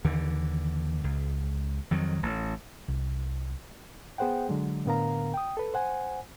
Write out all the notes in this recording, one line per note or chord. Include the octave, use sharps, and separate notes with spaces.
D#2 D3 E3
C#2
F2 D#3 F#3
A1
C2
B3 G#4 C5 F#5 G5
D3 F#3 G#3
A2 D3 B3 A#4 F5 A#5
G5 D#6
A4 B4
C5 F#5 G#5